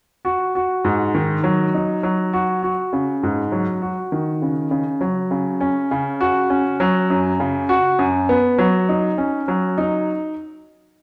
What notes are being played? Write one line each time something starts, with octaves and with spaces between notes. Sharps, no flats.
F#4
F#4
G#2
D#3
F#3
D#4
F#3
F#4
F#4
C#3
G#2
F#3
F#4
D#3
C#3
C#3
F#3
C#3
C#4
C#3
F#4
C#4
F#3
F#2
C#3
F#4
F#2
B3
F#3
D#4
C#4
F#3
D#4